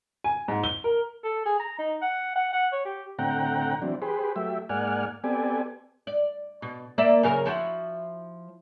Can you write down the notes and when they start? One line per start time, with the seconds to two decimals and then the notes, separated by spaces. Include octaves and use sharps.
0.24 G#5
0.48 G#2
0.64 G7
0.84 A#4
1.24 A4
1.45 G#4
1.59 A#5
1.78 D#4
2.02 F#5
2.36 F#5
2.53 F#5
2.73 C#5
2.85 G4
3.19 A2 D3 C4 F#5 G5 A#5
3.82 E3 F#3 C4 D4
4.02 G4 G#4 B4 C5
4.36 F#3 A3 G4 E5
4.69 G#2 A#3 D5 F#5 G#5 F6
5.24 B3 C4 G4 A4 D5 G#5
6.07 D5
6.62 B2
6.98 A#3 D5 E5
7.23 F#2 C#3 A#4
7.46 F3 E4 F#4